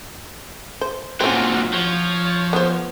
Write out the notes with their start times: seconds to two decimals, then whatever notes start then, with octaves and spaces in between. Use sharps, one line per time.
0.81 C5
1.20 A#2 F#3 C4 C#4 F4 F#4
1.73 F3 C#5
2.53 B3 C5